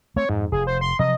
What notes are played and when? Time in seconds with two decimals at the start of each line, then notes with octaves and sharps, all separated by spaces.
0.16 A3 C4 C#5
0.29 F2 G#2
0.52 F1 G#4
0.67 C5
0.81 C6
0.99 C3 F3 F#3 D#5